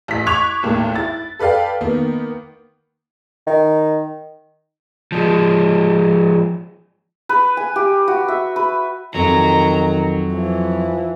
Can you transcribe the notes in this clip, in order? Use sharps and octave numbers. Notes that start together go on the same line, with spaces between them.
A1 B6
C#6 D6 F#6 G#6 F7
G#1 D#2 A2
E4 A6
A4 B4 D5 F5 G5
D#3 A#3 B3
D#3
F3 G#3
B4
G#5
G4
F#4
E5
B4
F2 D#3 F#3 A#5
E3 F3